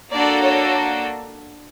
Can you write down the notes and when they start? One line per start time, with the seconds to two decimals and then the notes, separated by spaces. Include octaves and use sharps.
0.13 A#3 D4 F#4 A4 D5
0.41 C#5